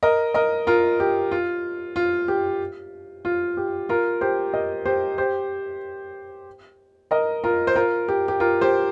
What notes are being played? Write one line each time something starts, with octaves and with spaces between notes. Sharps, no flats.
A#4 D#5
A#4 D#5
F4 A#4
G4
F4
F4
G4
F4
G4
F4 A#4
G4 C5
A#4 D#5
G4 C5
G4 C5
A#4 D#5
F4 A#4
C5
F4 A#4
G4
G4
F4 A#4
G4 C5